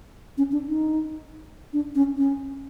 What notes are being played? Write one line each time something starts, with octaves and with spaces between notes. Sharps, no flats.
C#4
D4
D#4
D4
C#4
C#4